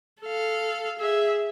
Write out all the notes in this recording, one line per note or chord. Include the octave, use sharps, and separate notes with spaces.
A4 F5
G#4 E5